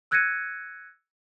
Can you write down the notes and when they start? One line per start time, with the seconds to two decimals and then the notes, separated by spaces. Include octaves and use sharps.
0.11 E6 F#6 G#6 A#6 C#7 D#7